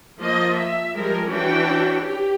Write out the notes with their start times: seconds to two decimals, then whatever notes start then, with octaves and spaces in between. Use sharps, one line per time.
0.19 F3 A#3 F4 D#5
0.53 E5
0.95 F3 G3 G#3 A#4
1.27 E3 C#4 D4 F#4 G5
2.00 G4